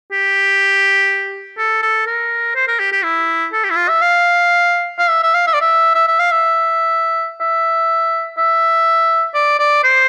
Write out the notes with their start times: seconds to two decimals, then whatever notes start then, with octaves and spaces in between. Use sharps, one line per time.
0.12 G4
1.58 A4
1.82 A4
2.07 A#4
2.55 C5
2.68 A#4
2.79 G4
2.92 G4
3.03 E4
3.53 A4
3.64 G4
3.70 E4
3.76 F4
3.89 E5
4.02 F5
4.98 F5
5.10 E5
5.23 E5
5.34 F5
5.47 E5
5.54 D5
5.61 E5
5.95 E5
6.07 E5
6.19 F5
6.31 E5
7.41 E5
8.37 E5
9.34 D5
9.59 D5
9.83 C5